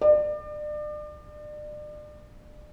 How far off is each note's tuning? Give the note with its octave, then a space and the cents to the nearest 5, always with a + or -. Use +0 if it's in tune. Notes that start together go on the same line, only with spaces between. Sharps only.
D5 +35